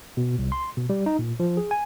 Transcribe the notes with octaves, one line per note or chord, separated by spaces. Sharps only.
B2
C2
C6
B2
G3
D#4
A#2
F3
G#4
G#5